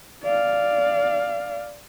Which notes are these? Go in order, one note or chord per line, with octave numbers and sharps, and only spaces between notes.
D5 F5